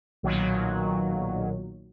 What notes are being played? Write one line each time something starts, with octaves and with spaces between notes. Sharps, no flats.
B1 A#2 D#3 F#3